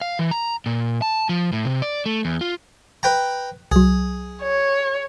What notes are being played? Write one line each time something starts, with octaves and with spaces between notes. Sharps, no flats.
F5
E3
A#5
A#2
A5
F3
A2
C3
D5
A3
E2
F4
B4 G5 A#5
C2 F#3 G#4
C#5